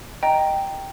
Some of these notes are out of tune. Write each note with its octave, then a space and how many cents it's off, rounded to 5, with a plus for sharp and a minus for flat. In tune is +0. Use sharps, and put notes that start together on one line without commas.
D#5 +0 G5 +0 A#5 +0